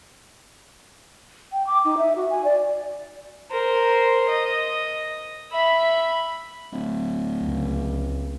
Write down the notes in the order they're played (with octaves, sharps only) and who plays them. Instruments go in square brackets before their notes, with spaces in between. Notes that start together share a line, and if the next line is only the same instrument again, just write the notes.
[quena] G5
D6
D#4
E5
F#4
G#5
D5
[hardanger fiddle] A#4 C5
D#5
E5 B5
[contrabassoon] D1
[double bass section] C#2